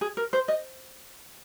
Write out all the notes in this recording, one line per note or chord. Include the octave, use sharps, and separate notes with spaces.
G#4
A#4
C5
D#5